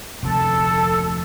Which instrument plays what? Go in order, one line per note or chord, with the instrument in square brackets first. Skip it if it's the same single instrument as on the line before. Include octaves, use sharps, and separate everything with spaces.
[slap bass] F1 D2 [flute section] A4